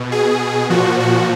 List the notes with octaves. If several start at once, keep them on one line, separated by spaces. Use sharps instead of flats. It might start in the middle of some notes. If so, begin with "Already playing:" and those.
Already playing: B2
G#4
A#2 F3 F#4
F#4